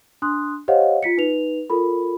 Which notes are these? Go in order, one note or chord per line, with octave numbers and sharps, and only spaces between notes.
D4 C6 D#6 F#6
G4 C5 C#5 D#5 F5 F#5
F4 B6 C#7
D#4 B4 F7
F4 A4 A#4 B5